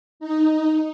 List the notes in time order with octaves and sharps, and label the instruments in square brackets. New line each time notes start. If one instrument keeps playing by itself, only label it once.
[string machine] D#4